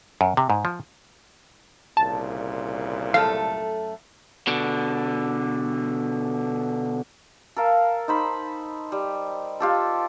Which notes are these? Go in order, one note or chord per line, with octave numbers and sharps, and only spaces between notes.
F#2
C3
G#2
F3
C2 A#2 C#3 A5
F#2 A3 A4 F5
B2 D3
A4 A#4 F5
D#4 C5 B5
G3
F4 G4 A4